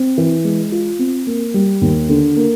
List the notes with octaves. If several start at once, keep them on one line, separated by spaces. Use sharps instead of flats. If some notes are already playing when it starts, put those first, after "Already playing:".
Already playing: C4
E3
G#3
F4
C4
A#3
G3
D#2
D3
A#3